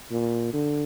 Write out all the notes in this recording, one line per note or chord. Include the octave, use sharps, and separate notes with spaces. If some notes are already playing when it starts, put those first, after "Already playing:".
A#2
D3